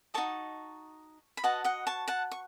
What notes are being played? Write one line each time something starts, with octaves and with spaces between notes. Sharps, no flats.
D#4 F#4 A4 D#5 A5 C#6
B5
F#4 B4 D#5 F#5 A5
D#5 F#5
A5 C#6
F#5 A5
C#6